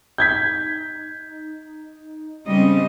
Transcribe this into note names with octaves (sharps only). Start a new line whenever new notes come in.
D#4 G6 G#6 B6
C#3 G3 C4 D#5